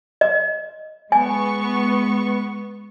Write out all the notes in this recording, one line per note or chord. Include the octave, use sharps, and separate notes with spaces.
D#5
G#3 B3 G#5 C#6